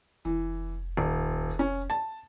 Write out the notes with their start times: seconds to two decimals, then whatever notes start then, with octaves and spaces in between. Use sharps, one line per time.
0.25 F1 E3
0.97 D#1
1.59 C#4
1.90 A5